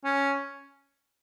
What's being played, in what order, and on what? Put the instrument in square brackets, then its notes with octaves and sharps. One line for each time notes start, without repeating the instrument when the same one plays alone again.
[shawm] C#4